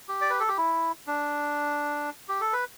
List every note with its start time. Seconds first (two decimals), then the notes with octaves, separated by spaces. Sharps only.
0.08 G4
0.21 D5
0.30 B4
0.40 A4
0.48 G4
0.58 E4
1.07 D4
2.29 G4
2.41 A4
2.53 B4